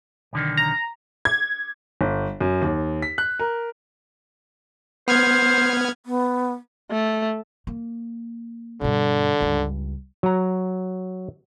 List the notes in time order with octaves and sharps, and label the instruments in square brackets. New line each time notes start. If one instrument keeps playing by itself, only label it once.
[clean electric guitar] B1 D3 D#3
[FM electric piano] A#5
[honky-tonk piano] G#6
[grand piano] G1
F#2
D#2
B6
F#6
A#4
[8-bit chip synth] B3 F6 G#6 [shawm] C5
[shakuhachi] B3
[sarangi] A3
[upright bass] A#3
[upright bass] G2 B2 [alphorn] D3
[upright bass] C#2 G2
[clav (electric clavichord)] F#3 A#5